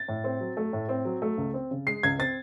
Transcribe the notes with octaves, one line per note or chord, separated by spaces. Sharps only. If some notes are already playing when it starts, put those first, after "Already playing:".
Already playing: A6
A2
C4
F#3
A3
A2
C4
F#3
A3
C#2
C4
C#3
G#3 C7
C#2 G#6
C4 A6